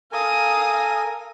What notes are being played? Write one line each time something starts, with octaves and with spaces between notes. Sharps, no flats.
A4 A#4 F5 G#5 D#6